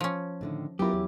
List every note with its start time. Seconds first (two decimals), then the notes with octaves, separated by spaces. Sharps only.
0.01 F3 C#4
0.41 A2 D3 D#3
0.79 F#3 B3 E4 F4 G4 A#4
0.93 E2